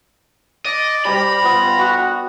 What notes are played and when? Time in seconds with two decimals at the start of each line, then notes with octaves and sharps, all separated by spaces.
0.65 D5 D#5
1.05 G3 G4 A#4 C5 A#5 B5
1.44 B3 F4
1.79 F#4